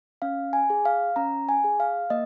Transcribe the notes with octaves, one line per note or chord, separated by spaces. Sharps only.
C#4 F5
G#5
G#4
F5
C#4 A#5
G#5
G#4
F5
A#3 D#5